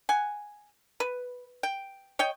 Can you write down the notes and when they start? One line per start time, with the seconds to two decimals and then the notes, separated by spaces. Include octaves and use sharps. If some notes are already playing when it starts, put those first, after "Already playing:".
0.09 F#5 G#5
1.00 B4
1.63 G5
2.19 C#5 D#5 G5